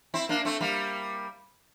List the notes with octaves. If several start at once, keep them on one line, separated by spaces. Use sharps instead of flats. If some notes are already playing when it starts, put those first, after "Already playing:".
C4 E4
A#3 D4
A3 C4
G3 A#3